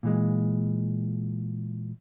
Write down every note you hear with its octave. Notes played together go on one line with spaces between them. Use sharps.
A#2 E3 G#3